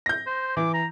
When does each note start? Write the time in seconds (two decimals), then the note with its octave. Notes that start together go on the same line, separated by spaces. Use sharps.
0.06 G6 A#6
0.27 C5
0.57 E3 D6
0.74 A#5